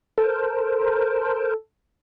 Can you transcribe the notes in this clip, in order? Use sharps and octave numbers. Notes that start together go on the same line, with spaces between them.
A4 A#4 C5